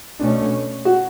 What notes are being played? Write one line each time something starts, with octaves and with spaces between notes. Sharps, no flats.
B2 A3 C#4 D4
F#4